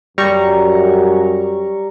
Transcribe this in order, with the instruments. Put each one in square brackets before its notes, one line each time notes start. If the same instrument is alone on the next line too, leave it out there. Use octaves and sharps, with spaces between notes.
[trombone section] F#2 [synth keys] G3 A#5 C#6